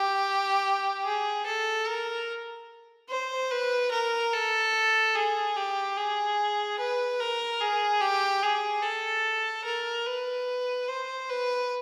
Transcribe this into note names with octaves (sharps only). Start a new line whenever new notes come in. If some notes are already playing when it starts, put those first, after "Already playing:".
Already playing: G4
G#4
A4
A#4
C5
B4
A#4
A4
G#4
G4
G#4
B4
A#4
G#4
G4
G#4
A4
A#4
B4
C5
B4